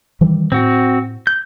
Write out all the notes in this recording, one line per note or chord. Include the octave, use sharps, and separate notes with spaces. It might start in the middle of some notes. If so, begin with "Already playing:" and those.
D#3 E3 G3
A2 C4 F#4
G6